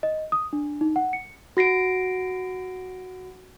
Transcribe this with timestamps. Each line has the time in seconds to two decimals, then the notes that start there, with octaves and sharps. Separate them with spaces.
0.03 D#5
0.32 D#6
0.53 D4
0.81 D#4
0.96 F#5
1.13 C#7
1.57 F#4 A#6 C7 D7